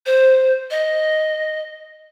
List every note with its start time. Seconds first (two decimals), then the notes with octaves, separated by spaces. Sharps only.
0.06 C5
0.71 D#5